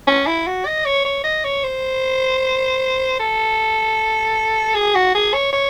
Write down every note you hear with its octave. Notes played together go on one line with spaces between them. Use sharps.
C#4
E4
F#4
D#5
C#5
C#5
D#5
C#5
C5
A4
G#4
F#4
G#4
C#5
C#5